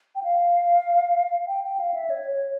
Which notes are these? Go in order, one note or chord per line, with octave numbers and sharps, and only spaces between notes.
G5
F5
G5
G5
F5
E5
C#5
C#5